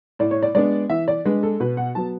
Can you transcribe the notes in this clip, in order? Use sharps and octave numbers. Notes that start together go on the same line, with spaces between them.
A2 D5
C#5
D5
G#3 B3 D4 D5
E3 E5
D5
G#3 D4 B4
A4
B2 B4
F#5
F#3 B3 A5